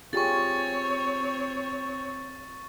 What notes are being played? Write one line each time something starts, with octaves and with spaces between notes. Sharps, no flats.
C4 F4 G4 G#4 C#5 C#6 A6